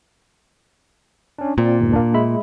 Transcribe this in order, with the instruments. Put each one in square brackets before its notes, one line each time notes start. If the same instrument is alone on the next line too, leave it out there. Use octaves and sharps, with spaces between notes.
[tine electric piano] C#4 D4
[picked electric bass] A#2 [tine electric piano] C4 F4 D5
[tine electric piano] G1 D#2 G#2
A#3 D4
G#3 E5 B5